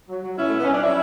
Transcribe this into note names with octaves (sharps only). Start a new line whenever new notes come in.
F#3
F#3
B2 C#4 E4
A3
B2 B3
G3 C#4
D4
F#3 C#4 E4